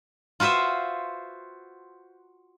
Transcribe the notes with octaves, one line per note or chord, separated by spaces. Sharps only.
F4 F#4 B4 C5 E5